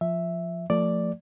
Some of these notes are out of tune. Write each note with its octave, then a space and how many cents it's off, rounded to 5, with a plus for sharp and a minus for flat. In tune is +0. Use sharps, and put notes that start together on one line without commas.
F3 +0 E5 +0
F3 +0 A3 +25 D5 +0